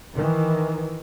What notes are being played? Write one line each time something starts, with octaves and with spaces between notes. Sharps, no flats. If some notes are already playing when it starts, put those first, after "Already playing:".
D#3 E3